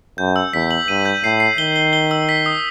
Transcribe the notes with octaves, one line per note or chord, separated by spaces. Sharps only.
F#2 G6
E6
E2 B6
F#7
G2 D#7
G6
A2 C7
C7
D#3 G7
G7
G7
E6
B6
D#6